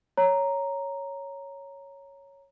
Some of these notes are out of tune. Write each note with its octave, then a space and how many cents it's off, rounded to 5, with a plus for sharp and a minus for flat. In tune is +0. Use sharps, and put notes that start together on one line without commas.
C#5 +0 A#5 +0